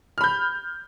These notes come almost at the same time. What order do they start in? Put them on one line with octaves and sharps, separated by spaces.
F6 B5 G6